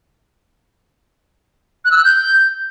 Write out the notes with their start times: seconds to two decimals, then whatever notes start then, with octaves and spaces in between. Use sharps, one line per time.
1.85 F#6
1.91 E6
1.98 F#6
2.04 G6